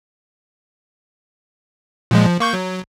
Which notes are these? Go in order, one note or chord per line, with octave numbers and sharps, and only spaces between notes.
A#2 F3 G#3
F3
A#3 C#6 G6
F#3